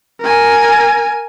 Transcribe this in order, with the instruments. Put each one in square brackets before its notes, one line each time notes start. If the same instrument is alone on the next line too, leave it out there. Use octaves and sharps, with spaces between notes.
[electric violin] A#4 G#5